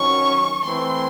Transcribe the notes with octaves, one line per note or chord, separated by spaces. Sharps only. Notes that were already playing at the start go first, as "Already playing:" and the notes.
Already playing: D#3 F#3 C#4 C#6
E3 A3 C4 E4 C6